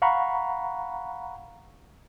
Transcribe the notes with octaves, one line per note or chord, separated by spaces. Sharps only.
F5 F#5 A#5 B5 C#6